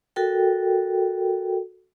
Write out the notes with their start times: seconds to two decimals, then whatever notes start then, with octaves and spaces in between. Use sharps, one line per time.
0.16 F#4 A4 A#4 G5